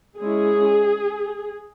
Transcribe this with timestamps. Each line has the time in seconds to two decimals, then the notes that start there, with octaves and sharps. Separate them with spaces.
0.20 G#3 C#4 E4 G#4